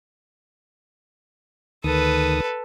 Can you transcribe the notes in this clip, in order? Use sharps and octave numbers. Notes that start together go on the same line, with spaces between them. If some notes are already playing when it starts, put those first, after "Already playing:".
D2 D#3 A4 B4 D#6